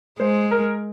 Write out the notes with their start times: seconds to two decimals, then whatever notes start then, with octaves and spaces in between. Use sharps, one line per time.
0.19 G#3 C5
0.51 A#4